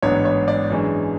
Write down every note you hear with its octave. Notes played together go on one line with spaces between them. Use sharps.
A1 G#2 F#3 B3 D4 C#5
C#5
D5
F#2 E3 G#3 D4